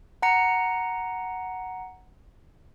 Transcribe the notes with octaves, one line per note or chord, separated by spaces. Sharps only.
F#5 A#5 C#7